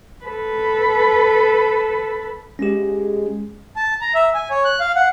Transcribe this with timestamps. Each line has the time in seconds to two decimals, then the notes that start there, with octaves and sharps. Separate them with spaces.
0.25 A4 B4
2.59 G#3 C#4 G4
3.76 A5
4.01 A#5
4.15 E5
4.34 G#5
4.50 C#5
4.65 F#6
4.80 F5
4.95 F#5